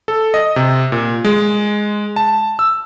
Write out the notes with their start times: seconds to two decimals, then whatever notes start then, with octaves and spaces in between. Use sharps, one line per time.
0.08 A4
0.34 D#5
0.56 C3
0.92 A#2
1.24 G#3
2.16 A5
2.59 E6